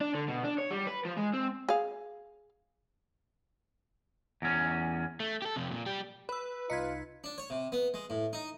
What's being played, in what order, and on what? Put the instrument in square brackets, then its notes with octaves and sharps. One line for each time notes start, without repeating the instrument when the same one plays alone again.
[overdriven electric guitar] D4
D3
B2
D4
C#5
G3
B4
F3
G#3
C4
[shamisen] G#4 F5
[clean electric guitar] E2 C#4
[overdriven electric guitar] A3
G4 A4
F2 C3
A#2
G3 G4
[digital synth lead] B4 [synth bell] B5 E6
[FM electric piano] C2 D#4 [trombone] F4 [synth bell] G#6 B6 C#7
[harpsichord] D4
C#5
C3
B3
G#3
A2
D#4